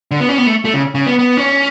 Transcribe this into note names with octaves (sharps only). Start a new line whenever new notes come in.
D3
B3
C#4
B3
A3
A3
C#3
C#3
B3
B3
C#4